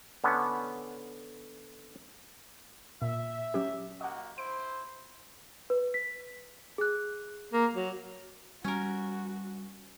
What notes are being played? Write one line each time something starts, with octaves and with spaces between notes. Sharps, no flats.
D3 B3 C#4
A#2 E5
F#3 C#4 G4
A#3 F#4 G4 D#5 F#5
E4 C5 D7
B4
B6
G#4 F#6
A#3
F#3
G3 C#4 F#4 A#4